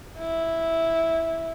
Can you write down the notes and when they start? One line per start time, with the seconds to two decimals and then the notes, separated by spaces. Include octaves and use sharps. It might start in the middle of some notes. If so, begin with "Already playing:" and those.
0.18 E4